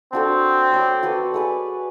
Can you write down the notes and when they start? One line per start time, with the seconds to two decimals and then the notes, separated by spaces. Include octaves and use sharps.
0.13 C4 D4 F#4 A4
0.72 C#5 D5 B5
1.03 F#4 A4 B4
1.34 G#4 B4 G#5